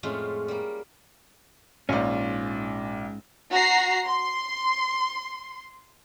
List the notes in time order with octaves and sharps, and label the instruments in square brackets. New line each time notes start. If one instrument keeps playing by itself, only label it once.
[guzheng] F2 A2 G#3 A3 C#4 F4
G3 A#3
[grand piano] A#1 F4 D5 [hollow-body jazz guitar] G#2 C#4
[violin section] F#4 A#5 C7
C6